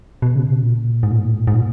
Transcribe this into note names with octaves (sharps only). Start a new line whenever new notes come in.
B2
C#3
B2
A#2
G#2
A#2
G#2
A#2
G#2
A#2
G#2
A#2